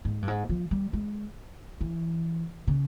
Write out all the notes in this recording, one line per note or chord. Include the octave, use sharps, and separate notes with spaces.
G#2
G2
G#2
F3
G3
G#3
E3
C#3